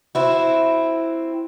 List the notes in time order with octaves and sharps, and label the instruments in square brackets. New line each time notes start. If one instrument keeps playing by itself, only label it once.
[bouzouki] C4 E4 F#4